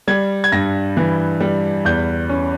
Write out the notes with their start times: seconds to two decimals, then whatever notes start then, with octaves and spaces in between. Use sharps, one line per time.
0.08 G3 G#6
0.44 G#6
0.52 G2 A#6
0.97 E3
1.41 G3
1.85 E2 G6
2.29 C#4